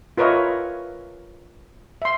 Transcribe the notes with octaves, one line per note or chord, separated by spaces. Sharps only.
F4 A#4 B4 C#5 D#5 E5
E5 C6